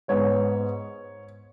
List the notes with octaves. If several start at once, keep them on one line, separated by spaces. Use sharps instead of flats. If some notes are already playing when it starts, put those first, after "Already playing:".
G#2 G#3 B3 C#5